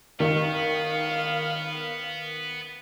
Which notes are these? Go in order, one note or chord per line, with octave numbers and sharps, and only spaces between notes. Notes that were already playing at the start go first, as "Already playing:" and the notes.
D#3 B3 F5